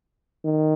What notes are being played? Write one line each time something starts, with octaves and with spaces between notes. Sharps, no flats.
D#3